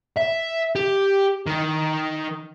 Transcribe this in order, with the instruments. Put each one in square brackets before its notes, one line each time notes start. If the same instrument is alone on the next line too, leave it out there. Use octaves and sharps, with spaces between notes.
[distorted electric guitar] E5
G4
D#3